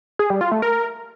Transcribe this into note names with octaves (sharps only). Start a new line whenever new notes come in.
G#4
G3
F4
A3
A#4